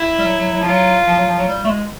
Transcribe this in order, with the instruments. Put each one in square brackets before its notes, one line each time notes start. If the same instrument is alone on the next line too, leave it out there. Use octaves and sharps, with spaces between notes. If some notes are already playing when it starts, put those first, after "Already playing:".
Already playing: [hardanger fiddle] E4
[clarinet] G3
F#3
F#3
F#3
F3
[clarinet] F#3 [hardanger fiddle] F4
[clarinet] F3
F#3
F3
F#3
G3
A3
G#3